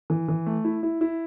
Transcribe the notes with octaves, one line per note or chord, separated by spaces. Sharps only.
E3
E3
A3
E4
E4
E4